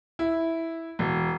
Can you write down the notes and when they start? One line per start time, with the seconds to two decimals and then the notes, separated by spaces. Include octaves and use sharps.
0.19 E4
0.99 E1